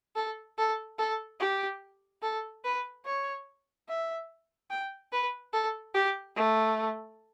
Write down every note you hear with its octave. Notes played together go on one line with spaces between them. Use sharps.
A4
A4
A4
G4
A4
B4
C#5
E5
G5
B4
A4
G4
A3